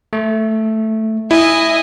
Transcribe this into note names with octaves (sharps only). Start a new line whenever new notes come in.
A3
E4 D#5 G#5